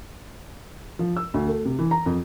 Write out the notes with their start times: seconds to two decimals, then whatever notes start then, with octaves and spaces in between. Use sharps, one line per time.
0.99 F3
1.16 E6
1.34 D2
1.48 A3
1.65 C3
1.79 E3
1.91 A#5
2.06 F2